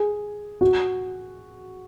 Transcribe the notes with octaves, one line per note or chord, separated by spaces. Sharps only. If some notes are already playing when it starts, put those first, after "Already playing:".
Already playing: G#4
F#4